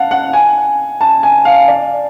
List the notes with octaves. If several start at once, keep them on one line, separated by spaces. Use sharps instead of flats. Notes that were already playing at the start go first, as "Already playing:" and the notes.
Already playing: F5 F#5 A5
F#5
G#5
A5
G#5
F5
D5